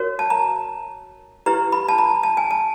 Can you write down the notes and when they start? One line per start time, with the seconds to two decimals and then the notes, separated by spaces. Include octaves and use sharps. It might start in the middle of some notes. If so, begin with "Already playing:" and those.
Already playing: F#4 A#4 C#5
0.19 A5
0.30 A#5
1.46 E4 G4 B4 A#5
1.72 B5
1.88 A5
1.98 A#5
2.23 A5
2.37 G#5
2.51 A5